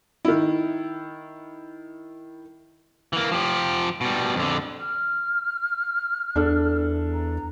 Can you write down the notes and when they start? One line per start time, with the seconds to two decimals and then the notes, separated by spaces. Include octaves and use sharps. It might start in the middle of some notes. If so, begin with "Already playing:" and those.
0.25 D#3 E4
3.13 E3 A#3
3.32 F3 G4
4.01 B2 G3
4.35 F2 D3
4.79 F6
6.36 E2 D4 A4
7.13 A#5